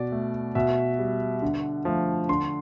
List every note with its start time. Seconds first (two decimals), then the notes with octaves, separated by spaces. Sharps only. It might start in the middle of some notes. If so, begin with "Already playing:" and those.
Already playing: B2 D5
0.12 A3
0.55 B2 E5
0.99 G3
1.42 D3
1.85 F3 A3
2.29 D3 C6